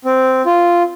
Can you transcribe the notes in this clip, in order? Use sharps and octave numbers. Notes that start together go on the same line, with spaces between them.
C4
F4